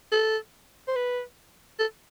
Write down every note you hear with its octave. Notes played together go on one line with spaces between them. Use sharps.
A4
C5
B4
A4